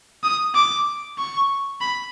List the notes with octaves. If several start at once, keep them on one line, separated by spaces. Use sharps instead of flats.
D#6
D6
C#6
B5